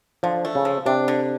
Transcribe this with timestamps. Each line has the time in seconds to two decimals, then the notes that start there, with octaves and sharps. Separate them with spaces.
0.23 D3 F3
0.45 A3
0.55 C#3
0.65 F3
0.86 C3 D4
1.08 D3